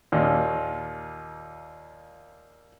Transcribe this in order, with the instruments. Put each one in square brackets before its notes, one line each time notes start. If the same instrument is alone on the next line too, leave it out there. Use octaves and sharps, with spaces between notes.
[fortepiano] D#2 A#2